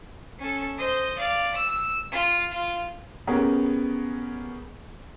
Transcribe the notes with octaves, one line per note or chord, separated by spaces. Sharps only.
C#4 A4
C5 D#5
D5 F5
E6
F4
F4
B3 C#4 G4 G#4 A#4